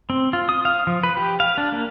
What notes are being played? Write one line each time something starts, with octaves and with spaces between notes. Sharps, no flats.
C4
F4
D#6
F5
F3
B4
G4
F5
D4
A#3